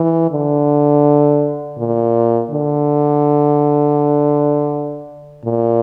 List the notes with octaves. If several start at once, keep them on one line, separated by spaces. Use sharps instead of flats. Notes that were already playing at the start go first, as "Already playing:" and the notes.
Already playing: E3
D3
A#2
D3
A#2